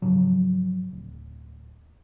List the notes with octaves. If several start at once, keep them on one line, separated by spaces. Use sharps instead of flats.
G#2 C#3 F3 F#3
D1